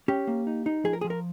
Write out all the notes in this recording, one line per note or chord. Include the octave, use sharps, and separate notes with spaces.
C#4 G4
A#3
D#4
D#4
F3 G#4
A#4
F3 G#4
A#4